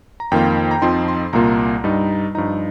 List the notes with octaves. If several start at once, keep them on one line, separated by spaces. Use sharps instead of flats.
A#5
F2 D#3 A#3 F4 G5
A#5
F2 F3 C4 D#4 C6
C6
C2 A#2 A#3 F4 A#5
G2 G3 D#4
G2 F3 D#4 A#5